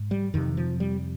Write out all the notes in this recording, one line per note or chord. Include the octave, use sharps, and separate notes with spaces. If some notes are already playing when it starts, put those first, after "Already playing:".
Already playing: G#2
G3
F2 C3 D#3
F3
G3